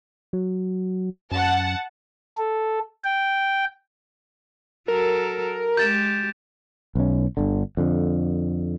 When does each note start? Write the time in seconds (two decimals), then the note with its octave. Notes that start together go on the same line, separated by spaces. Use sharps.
0.33 F#3
1.31 F#2 F#5 A5
2.37 A4
3.04 G5
4.88 F#3 A4 A#4
5.77 G#3 G4 G6 A6 E7
6.95 B1 C#4
7.37 G1 D3
7.77 F2 D3